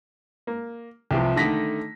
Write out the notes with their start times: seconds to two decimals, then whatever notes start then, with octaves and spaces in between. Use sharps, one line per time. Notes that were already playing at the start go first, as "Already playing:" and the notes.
0.47 A#3
1.11 C2 C3 E3 F3 G4
1.36 D3 D#3 A3 A#6 B6